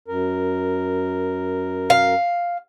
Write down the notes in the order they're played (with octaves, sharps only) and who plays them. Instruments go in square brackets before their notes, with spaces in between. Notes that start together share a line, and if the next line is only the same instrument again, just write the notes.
[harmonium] F#2 A#4
[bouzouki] F5